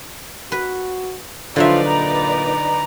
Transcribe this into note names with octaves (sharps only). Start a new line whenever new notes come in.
F#4 B4
D3 F3 F#3 D#4 F4 B4 D5 E5
A#2 A#5